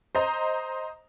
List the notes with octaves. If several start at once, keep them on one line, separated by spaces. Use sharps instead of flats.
C5 D#5 A#5